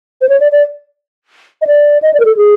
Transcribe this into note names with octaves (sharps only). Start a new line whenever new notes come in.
C5
C#5
D5
D5
D#5
D5
D#5
D5
A#4
A4
G#4